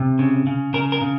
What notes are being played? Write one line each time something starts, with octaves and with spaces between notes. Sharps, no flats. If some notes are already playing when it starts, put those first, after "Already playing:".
Already playing: C3
C#3
C#3
C#3 A#4
A#4
C#3